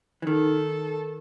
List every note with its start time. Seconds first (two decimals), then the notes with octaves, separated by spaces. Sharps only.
0.22 E3
0.27 D#3 A4